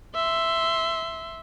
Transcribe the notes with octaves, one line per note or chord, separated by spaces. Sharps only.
E5 C6